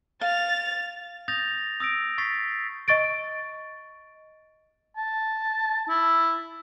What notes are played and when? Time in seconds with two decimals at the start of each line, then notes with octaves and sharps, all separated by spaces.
0.21 F5 A6 F7
1.28 D#6 G6 A6 A#6 F7
1.80 D#6 E6 A#6 D7
2.18 C#6 A6 B6 C7
2.88 D#5 C#6 A6 D7
4.97 A5
5.89 E4